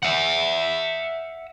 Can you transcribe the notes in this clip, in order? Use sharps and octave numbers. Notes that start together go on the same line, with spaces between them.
E5 F#5